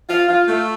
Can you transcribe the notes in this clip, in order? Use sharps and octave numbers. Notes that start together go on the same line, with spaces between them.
F4
F4
A3